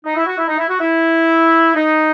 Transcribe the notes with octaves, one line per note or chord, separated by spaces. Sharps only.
D#4
E4
F#4
E4
D#4
E4
F#4
E4
D#4